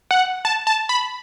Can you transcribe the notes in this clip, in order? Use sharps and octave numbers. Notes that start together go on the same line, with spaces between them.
F#5
A5
A5
B5